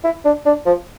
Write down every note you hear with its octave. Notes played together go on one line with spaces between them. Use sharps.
E4
D4
D4
F3